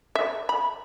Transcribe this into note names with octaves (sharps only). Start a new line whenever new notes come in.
E5
B5